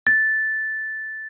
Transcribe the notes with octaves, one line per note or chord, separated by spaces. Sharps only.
A6